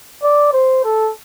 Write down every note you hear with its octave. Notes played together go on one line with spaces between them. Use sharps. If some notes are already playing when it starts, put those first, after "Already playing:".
D5
C5
A4